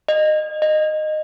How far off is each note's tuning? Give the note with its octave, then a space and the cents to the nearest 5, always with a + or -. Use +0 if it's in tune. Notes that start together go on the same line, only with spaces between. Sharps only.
D#5 -20
D#5 -15